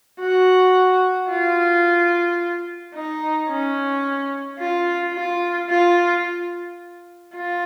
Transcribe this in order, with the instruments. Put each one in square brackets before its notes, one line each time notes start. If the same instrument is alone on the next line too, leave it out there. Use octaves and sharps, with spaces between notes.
[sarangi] F#4
F4
D#4
C#4
F4
F4
F4
F4